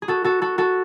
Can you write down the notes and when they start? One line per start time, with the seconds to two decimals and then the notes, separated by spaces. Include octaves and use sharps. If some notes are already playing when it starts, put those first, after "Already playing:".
0.02 G#4
0.08 F#4 A4
0.24 F#4 A4
0.42 F#4 A4
0.58 F#4 A4